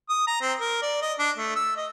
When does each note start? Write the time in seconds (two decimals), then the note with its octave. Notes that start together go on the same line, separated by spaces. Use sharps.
0.09 D#6
0.27 A#5
0.41 C4
0.60 A#4
0.82 D5
1.02 D#5
1.19 D4
1.38 A3
1.56 E6
1.77 D#5